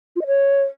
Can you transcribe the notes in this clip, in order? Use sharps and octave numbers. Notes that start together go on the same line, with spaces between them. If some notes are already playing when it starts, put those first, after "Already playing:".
F4
D#5
C#5